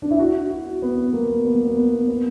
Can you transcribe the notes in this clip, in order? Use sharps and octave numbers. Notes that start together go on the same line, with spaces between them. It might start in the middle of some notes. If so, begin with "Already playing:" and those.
D4
E4
F#4
F#4
B3
A#3
B3
A#3
B3
B3
B3